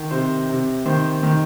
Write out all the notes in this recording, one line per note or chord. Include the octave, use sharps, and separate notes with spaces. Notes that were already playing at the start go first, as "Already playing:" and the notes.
Already playing: D#3
C3 C5
C3
D#3 C5
D#3